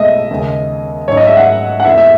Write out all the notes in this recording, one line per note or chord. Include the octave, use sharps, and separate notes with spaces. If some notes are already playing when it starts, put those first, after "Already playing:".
Already playing: B1 B2 A3 D#5 E5
D#2 C#3 G#3
G#2 F#3 C#4 C#5
D#5
E5
F#5
F#5
E2 B2 A3 E4 B4 E5
E5